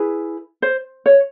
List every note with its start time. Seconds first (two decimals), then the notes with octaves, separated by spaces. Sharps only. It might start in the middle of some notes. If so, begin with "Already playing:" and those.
Already playing: E4 G#4 B4
0.62 C5
1.06 C#5